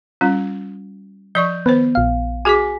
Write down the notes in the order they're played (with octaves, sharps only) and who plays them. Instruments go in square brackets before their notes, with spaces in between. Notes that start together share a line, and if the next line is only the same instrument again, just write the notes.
[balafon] G3 C#4 F4
[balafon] F3 D5 C#6 [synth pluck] G6
[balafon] D#3 B4 C5 [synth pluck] B3
[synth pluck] A#1 F5
[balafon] F#4 G#4 D6 [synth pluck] G#5 B6